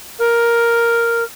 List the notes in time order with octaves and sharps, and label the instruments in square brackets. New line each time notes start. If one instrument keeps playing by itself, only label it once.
[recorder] A#4